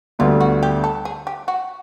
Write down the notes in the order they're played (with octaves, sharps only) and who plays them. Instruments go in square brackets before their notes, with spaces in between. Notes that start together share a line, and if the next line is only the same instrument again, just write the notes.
[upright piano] D2 D3 G3 B3 [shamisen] F4
[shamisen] F#4
G4
A4
G#4
G4
F#4